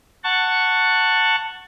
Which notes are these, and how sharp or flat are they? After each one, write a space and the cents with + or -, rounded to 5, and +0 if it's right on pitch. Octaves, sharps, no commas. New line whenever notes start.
F#5 +0 A5 +15 C#6 +0